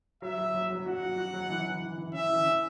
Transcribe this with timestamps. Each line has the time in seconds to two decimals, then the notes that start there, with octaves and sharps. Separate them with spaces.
0.22 F#3 E5
0.38 F#3
0.54 F#3
0.70 F#3
0.86 F#4 F#5
1.02 F#4
1.18 F#4
1.34 F#3
1.50 E3
1.65 E3
1.82 E3
1.97 E3
2.13 C#4 E5
2.29 E3
2.45 C#4